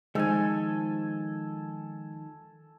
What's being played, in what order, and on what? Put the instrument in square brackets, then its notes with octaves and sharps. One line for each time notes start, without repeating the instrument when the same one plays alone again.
[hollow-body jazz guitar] D#3 F3 [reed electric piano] G#3 [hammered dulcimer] A4 G#5